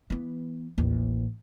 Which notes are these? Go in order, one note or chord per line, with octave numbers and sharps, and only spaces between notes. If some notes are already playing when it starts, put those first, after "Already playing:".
E3 B3
A1 D#2